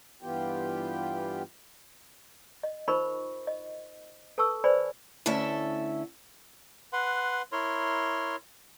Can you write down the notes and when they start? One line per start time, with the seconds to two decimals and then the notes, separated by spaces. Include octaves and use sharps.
0.23 G2 E3 B3 F4 G4 G5
2.63 D#5
2.88 D#4 F4 A#4 C5 B5 C#6
3.47 D#5
4.38 A4 B4 A5 C#6 E6
4.64 B4 C5 D5 G#5 B5
5.26 D2 C#4 E4 A4 E5
6.93 B4 F#5 C6
7.52 E4 A#4 C#5 C6